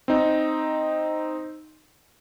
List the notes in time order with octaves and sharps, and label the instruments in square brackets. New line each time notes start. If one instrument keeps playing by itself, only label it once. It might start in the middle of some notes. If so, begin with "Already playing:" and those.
[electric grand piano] C4 D#4